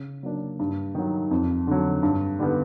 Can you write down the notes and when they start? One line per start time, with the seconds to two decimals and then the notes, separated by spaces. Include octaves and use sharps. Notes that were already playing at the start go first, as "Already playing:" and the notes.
Already playing: C#3
0.23 F#3 A#3 D4
0.59 G2
0.95 D#3 F#3
1.31 F2
1.67 D3 F#3
2.03 G2
2.39 D3 G3 B3